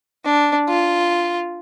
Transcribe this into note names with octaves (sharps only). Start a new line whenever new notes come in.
D4
F4